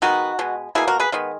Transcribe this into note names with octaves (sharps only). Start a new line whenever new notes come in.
D#3 G#3 B3 D#4 F#4
B2 G#3 B3
B2 A#3 E4 G#4
F#4 A#4
G#4 B4
D#3 G#3 B3